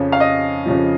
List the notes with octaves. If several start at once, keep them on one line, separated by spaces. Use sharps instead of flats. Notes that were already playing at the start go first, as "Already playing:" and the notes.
Already playing: F2 C#3 F3 C#5
F5
D#5
F2 C#3 F3